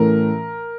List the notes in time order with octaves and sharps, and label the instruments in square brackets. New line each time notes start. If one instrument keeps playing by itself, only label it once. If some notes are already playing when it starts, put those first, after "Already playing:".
Already playing: [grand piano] A2 E3 A3 C#4 A#4